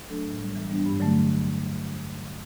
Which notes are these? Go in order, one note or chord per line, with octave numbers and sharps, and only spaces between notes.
F#3 A3 D4 A4
A2
G3 B3
E3
G3 B3 D4
G2
D3 F#3 A3